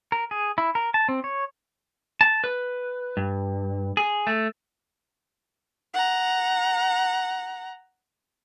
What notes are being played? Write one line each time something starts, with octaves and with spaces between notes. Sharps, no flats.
A#4
G#4
E4
A#4
A5
C4
C#5
A5
B4
G2
G#4
A3
F#5 A#5